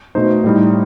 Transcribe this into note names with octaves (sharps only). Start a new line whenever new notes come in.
B2 A3 D#4 C5
A2 G3 D#4